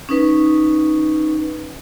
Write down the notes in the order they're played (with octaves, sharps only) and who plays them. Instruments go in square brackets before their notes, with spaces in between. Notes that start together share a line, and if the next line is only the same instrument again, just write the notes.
[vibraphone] C#4 D#4 B4